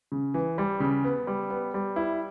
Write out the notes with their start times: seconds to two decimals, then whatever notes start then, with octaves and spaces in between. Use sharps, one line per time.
0.12 C#3
0.34 E3
0.58 G3
0.80 C#3
1.04 B3
1.27 G3
1.50 B3
1.74 G3
1.96 E4